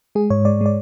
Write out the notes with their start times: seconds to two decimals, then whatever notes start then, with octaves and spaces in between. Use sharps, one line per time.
0.15 G#3 G#4
0.30 G#2 C#5
0.45 G#3 D5
0.61 G#3 D5